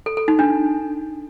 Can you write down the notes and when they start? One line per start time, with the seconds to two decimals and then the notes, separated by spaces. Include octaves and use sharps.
0.06 A4
0.17 A4
0.28 D#4
0.39 D4